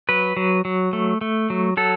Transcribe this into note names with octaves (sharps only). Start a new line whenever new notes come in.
F#3 B4
F#3
F#3
A3
A3
F#3
F#3 A4